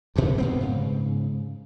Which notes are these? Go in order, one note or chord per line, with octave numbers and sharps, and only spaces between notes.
D2 G2 A#2
G2 B3 C4
G#2 C#3